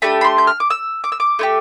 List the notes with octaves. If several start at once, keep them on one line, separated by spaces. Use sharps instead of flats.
A3 D4 G4 B5
B5
C6
G6
F6
D6
E6
D6
E6
D6
A3 E4 G4